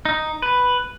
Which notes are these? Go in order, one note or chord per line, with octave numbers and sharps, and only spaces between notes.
D#4
B4